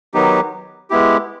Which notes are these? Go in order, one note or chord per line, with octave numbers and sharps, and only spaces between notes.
D#3 F#3 B3 D#4 G4
G#3 B3 E4 G4